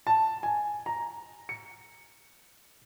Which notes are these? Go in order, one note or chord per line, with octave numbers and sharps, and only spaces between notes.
A5
G#5
A#5
C#7